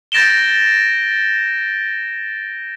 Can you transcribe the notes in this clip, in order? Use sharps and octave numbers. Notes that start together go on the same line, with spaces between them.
G6 A6 A#6 D7 E7 G7